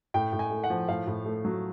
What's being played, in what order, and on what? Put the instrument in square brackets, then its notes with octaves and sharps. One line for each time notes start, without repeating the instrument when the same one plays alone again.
[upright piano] A2 G5
A2
G#5
A3
F#5
F3
A2 F5
A2
A3
F#3